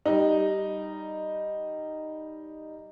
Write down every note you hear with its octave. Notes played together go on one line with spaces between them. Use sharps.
G3 D#4